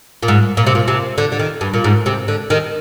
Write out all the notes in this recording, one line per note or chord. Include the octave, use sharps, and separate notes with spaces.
A#2
G#2
A#2
C3
A#2
C3
D3
D3
D#3
G2
A#2
G#2
C3
D3
D#3